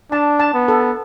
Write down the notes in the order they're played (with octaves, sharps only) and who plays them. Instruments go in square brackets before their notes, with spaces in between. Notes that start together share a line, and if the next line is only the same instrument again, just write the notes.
[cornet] D4 [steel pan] A5
[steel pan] A5
[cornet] B3
[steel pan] A4